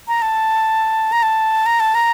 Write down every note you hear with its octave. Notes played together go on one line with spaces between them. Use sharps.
A#5
A5
A#5
A5
A#5
A5
A#5